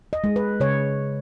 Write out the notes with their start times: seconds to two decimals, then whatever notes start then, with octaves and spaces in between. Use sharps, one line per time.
0.13 D#5
0.24 G#3
0.36 B4
0.60 C#3 C#5